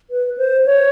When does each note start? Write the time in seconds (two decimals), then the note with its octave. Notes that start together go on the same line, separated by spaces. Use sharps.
0.10 B4
0.38 C5
0.66 C#5